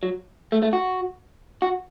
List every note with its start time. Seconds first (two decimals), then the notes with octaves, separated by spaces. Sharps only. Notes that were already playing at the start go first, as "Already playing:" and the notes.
0.03 F#3
0.52 A3
0.63 A3
0.73 F#4
1.62 F#4